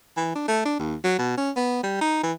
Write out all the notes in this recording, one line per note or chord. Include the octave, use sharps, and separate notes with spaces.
E3
D4
A3
D4
D#2
F#3
B2
C#4
B3
G3
D#4
E3